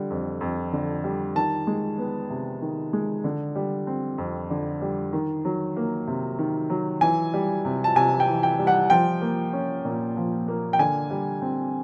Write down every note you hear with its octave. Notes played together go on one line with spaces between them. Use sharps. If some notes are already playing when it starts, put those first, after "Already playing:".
Already playing: D3 G3
F2
F2
D3
G3
D#3 A5
G#3
B3
C3
D#3
G#3
D3
G3
C4
F2
D3
G3
D#3
F#3
A#3
C3
D#3
F#3
E3 G#5
G3
C3
A5
C3 G#5
G5
E3
G5
G3
F#5
F3 G5
A#3
C#4
A#2
F3
A#3
G5
D3 G#5
G3
C4